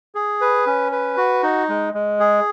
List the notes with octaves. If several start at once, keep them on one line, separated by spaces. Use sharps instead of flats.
G#4
B4
C#4
B4
F#4
D#4
G#3
G#3
G#4